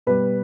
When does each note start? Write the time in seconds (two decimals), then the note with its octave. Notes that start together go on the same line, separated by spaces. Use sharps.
0.07 B2 G3 B4